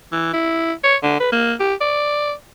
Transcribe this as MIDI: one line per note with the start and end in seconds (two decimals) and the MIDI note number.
0.12 0.33 52
0.34 0.72 64
0.84 0.96 73
1.03 1.17 50
1.20 1.28 71
1.32 1.53 58
1.60 1.74 67
1.81 2.33 74